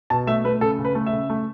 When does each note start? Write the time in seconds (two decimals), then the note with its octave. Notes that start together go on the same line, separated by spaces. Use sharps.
0.10 B2 A5
0.27 A3 E5
0.44 A3 B4
0.61 C#3 A4
0.79 C#3
0.85 B4
0.95 A3
1.06 E5
1.13 C#3
1.30 A3